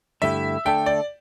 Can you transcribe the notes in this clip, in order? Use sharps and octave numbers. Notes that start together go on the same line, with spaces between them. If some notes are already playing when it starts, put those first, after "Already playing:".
G2 D3 A3 E4 G4 E5
D3 A3 D4 A4 G5
D5